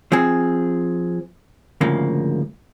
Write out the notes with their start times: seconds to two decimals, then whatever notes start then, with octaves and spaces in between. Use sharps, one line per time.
0.12 F3 C4 G#4
1.81 D2 G#2 C#3 F3 A#3